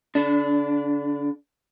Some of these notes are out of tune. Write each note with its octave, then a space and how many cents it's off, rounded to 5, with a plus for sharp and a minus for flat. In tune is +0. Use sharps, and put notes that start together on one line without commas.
D3 -40 D4 -10